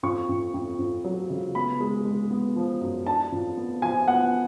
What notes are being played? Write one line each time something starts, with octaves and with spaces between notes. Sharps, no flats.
F2 C#6
F2
F2
F2
F#3
C#3
B3 B5
G#3
G#3
B3
F3
F#2
D4 A5
F2
B3
F3 G#5
B3 F#5